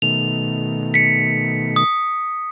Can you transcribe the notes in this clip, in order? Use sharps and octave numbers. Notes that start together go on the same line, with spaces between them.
B2 D#3 A3 F7
B6 C#7
D#6